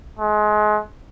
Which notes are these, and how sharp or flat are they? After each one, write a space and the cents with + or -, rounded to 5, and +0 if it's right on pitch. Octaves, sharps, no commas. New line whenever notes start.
G#3 +30